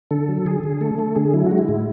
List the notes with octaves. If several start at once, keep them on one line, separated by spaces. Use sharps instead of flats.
D3 A4
F#3
D3 G#4
D3
A3 A4
A3 A4
D3 G#4
F#3 E4
G#3 F#4
E4
A2